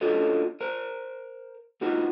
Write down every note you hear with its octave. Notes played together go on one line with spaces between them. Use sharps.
D4 F4 F#4 A4 C#5 D#5
A#4 C5
B3 D#4 F4 F#4 B4 D#5